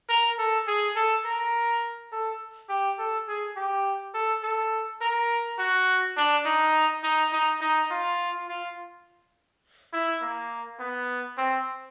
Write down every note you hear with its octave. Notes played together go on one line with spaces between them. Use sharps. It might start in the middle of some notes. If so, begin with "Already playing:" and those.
A#4
A4
G#4
A4
A#4
A4
G4
A4
G#4
G4
A4
A4
A#4
F#4
D4
D#4
D#4
D#4
D#4
F4
F4
E4
A#3
B3
C4